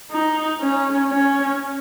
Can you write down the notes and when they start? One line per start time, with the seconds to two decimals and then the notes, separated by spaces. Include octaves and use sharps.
0.11 D#4
0.60 C#4
1.09 C#4